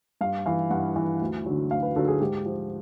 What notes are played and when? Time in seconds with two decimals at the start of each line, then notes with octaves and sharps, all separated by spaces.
0.21 G2 F5
0.46 E3 F5
0.71 G2 F#5
0.96 E3
1.21 D2
1.46 D3 F#3
1.71 D2 F5
1.83 B4
1.96 D3 F#3 A4
2.08 G#4
2.20 G#2 G4
2.45 F3